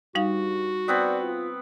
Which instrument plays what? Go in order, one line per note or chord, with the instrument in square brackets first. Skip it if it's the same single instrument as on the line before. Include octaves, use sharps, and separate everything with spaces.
[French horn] G2 [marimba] G3 D#4 F5 [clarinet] F#4
[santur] B3 C4 B4 [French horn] D5
[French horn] F4